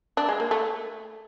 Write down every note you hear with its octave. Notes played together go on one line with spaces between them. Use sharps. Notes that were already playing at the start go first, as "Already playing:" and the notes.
D4
G#3
A#3
A3